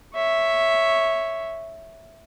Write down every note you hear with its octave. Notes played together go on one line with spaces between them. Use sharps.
C#5 E5